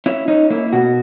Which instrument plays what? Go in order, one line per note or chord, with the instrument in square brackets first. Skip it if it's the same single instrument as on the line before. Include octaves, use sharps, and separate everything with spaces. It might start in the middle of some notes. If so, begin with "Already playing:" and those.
[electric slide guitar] C#4 E4
C#4 D#4
A#3 E4
B2 F#4